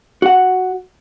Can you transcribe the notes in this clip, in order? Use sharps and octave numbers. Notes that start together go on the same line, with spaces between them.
F#4 F#5